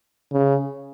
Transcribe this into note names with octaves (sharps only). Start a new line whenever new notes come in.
C#3